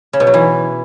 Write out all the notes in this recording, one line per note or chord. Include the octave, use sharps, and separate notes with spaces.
C#3
B2
F#3
E3